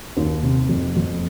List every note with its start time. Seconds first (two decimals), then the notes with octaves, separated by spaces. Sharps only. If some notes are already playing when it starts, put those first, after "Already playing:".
0.17 D#2
0.43 C3
0.69 F2
0.96 F2